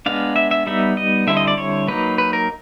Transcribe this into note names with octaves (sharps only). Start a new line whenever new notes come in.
G#3 B3 D4 F5
E5
E5
G3 B3 D#4 E5
D#5
D3 G3 C4 E4 E5
D#5
D5
C#5
F#3 A#3 D#4 B4
B4
A#4